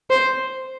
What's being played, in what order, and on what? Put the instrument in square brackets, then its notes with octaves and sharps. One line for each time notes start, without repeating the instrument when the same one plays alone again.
[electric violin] C5